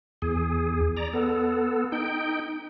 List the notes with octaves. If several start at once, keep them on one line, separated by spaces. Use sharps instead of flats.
E2 G#4
D5 A#5
B3 A4
D#4 G5